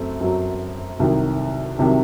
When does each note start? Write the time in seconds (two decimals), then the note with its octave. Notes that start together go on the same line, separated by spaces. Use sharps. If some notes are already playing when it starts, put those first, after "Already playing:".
Already playing: F#2 A3 C4
0.21 F#2 F#3
0.99 C2 C3 D#3 F#3
1.78 C2 C3 D#3 F#3